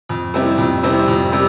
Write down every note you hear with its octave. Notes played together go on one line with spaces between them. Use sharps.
F2
C3 G3 C4 E4
F2
C3 G3 C4 E4
F2
C3 G3